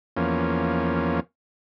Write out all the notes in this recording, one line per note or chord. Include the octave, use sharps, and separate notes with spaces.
E2 F3 A#3 C#4